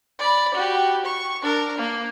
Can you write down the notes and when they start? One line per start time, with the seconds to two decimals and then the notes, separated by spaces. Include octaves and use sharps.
0.19 D5 B5
0.54 F#4 G4
1.05 C#6
1.42 D4 A#4
1.78 A#3